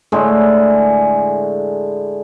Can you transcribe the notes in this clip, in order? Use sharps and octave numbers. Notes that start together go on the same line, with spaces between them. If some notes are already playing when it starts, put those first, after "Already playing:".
A2 D3 G#3